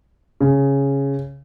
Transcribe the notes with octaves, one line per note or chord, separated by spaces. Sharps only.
C#3